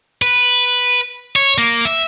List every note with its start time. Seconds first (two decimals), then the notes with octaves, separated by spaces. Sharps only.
0.22 B4
1.36 C#5
1.58 A#3
1.85 E5